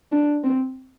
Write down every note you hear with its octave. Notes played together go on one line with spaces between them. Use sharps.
D4
C4